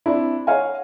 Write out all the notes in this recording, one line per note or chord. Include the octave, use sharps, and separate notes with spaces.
C4 D4 E4
C#5 D#5 F5 F#5 G#5